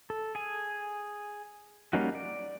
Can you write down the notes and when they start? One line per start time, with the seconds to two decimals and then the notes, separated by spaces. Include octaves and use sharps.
0.10 A4
0.35 G#4 G#5
1.93 G3 A#3 C#4 D#4 F#4
2.15 D5